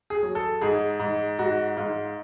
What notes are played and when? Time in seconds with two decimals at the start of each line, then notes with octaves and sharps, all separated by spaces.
0.10 G#4
0.23 F#3
0.35 A4
0.61 G#2 G#4
1.00 G#2
1.39 G#2 F#4
1.77 G#2 F4